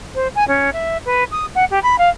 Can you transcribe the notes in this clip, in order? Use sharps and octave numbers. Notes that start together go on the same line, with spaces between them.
C5
G#5
C#4
E5
B4
D#6
F#5
G4
B5
F5